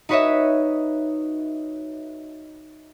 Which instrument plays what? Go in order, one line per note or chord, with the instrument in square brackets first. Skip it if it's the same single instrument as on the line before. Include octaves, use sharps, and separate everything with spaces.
[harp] D#4 F#4 B4 C#5 D#5 E5